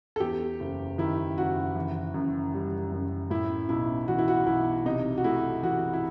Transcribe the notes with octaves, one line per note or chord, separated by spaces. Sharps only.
A4
E2 G4
F#1
D#3 E4
F#1 F#4
E3
F#2
G3
F#2
A2 E4
B1 E4
E3 F#4
E4
F#4
B1 E4
C3 D#4
F#4
A3 E4
E3 F#4
E4